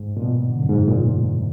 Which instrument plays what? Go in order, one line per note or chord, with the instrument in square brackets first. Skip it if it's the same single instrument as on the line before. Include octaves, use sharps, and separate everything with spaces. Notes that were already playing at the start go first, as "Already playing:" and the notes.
Already playing: [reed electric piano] G#2
A#2
B2
D3
F#2
G#2
A#2